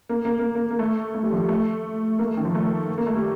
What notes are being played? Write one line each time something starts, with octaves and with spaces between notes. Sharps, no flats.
A#3
A#3
A#3
A#3
A#3
A3
A3
G3
F3
G3
A3
A#3
A3
D#3
F3
A3
A#3
A3
G3